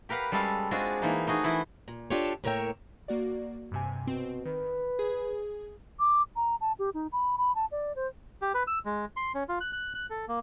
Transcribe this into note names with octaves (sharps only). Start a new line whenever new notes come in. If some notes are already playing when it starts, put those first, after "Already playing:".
G4 A#4 B4 F5 F#5
G3 G#3 C#4 A4 F5
G#3 C4 D4 F4 F#4 G#4
E3 A#3 D#4
A3 D#4 F#4 G#4
E3 E4 F#5
A#2
D4 F4 G4 A4 C#5
A2 A#3 A#4 C#5 E5 G5
A#3 F#4 D5
G2 C3 G#5
B2 C4
D#3 B4
G#4
D6
A#5
A5
G4
D#4
B5
B5
A5
D5
C5
G4
B4
E6
G#3
C6
C#4
F4
F#6
F#6
F#6
A4
A#3